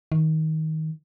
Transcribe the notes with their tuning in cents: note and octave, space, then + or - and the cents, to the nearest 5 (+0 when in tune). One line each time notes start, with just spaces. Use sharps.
D#3 +20